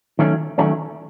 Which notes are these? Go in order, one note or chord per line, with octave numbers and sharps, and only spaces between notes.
D#3 F#3 A3 C#4
D#3 F#3 A3 C#4